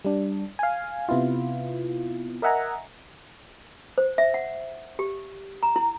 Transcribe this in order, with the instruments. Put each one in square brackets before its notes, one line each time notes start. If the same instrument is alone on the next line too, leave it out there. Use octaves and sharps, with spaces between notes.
[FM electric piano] G3 D4
F5 G#5
C3 B3 E4 F4
A#4 D#5 E5 F#5 G#5 A#5
[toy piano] C5
E5
F#5
G4
A#5
E4